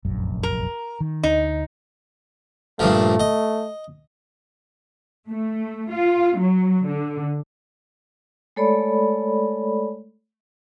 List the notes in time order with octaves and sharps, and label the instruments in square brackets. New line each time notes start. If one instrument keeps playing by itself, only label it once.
[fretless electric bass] F1 A#1 F#2
[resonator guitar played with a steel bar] A#4
[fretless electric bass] D#3
[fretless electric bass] D2 [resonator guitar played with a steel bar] D#4
[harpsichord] G2 A#2 F3 [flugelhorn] A3
[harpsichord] D#5
[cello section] A3
F4
F#3
D3
[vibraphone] G#3 A3 A4 C#5 D5 B5